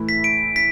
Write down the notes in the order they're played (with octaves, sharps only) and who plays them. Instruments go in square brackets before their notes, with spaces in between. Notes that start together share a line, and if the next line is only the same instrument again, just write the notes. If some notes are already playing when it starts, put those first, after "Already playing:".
Already playing: [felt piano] A2 E3 A3 E4
[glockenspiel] B6
D7
B6